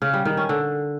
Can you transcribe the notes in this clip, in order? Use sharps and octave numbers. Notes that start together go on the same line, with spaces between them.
C#3
G3
D#3
C#4
D3